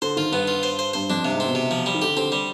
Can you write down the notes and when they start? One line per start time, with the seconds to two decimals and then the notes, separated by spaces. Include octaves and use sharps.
0.02 D3 C5
0.16 D#3 F4
0.32 G2 B3
0.48 F4
0.63 C5
0.79 C5
0.93 G2 C5
1.10 F2 D4
1.25 G2 C3
1.35 G#2
1.40 B2 C4
1.55 C3
1.71 F3
1.86 G3
1.94 D#3
2.02 D3 G4
2.17 D3 C4
2.32 G3